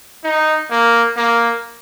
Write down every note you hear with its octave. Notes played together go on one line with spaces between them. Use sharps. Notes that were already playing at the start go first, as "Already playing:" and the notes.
D#4
A#3
A#3